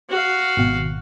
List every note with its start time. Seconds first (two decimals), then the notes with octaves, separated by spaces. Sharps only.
0.10 F#4 F5
0.57 G#1 B2